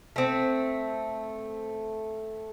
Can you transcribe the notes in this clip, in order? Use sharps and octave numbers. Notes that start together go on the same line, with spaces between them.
A3 C4